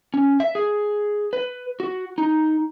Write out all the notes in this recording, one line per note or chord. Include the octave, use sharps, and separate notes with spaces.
C#4
E5
G#4
B4
F#4
D#4